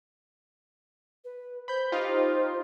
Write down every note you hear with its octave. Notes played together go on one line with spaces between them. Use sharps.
B4
C5 B5 G6
D#4 F4 G4